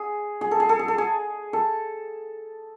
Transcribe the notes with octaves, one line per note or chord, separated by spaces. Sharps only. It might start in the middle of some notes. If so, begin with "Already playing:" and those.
Already playing: G#4
G#4
A4
G#4
A4
G#4
A4
G#4
A4